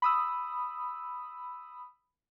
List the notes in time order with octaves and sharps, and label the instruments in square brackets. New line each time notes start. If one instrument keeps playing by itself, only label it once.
[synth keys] B5 D#6 E6